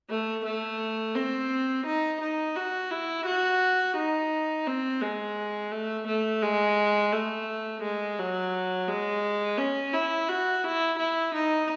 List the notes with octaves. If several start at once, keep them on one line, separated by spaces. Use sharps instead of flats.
A3
A3
C4
D#4
D#4
F#4
E4
F#4
D#4
C4
G#3
A3
A3
G#3
A3
G#3
F#3
G#3
C#4
E4
F#4
E4
E4
D#4